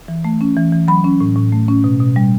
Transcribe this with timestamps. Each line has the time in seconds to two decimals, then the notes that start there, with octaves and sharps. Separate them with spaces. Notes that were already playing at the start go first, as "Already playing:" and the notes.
0.08 E3
0.24 A3
0.41 C#4
0.57 E3
0.72 E3
0.88 F#3 B5
1.04 C#4
1.21 A2
1.36 A2
1.52 A3
1.68 C#4
1.84 B2
2.00 B2
2.16 G3